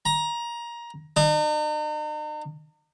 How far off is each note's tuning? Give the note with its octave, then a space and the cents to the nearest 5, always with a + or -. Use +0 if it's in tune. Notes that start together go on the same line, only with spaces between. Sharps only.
A#5 +20
D#4 -45